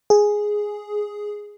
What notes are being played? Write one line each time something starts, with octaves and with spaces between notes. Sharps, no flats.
G#4